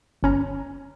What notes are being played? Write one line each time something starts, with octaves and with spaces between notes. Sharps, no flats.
G1 C#4 A#5